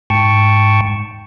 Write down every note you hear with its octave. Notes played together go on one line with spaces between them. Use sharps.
G#2 G5 A5 C#6